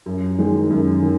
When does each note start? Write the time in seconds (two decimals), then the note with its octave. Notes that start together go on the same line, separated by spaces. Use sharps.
0.06 F#2
0.38 D#3 G#3
0.70 F#2
1.02 D#3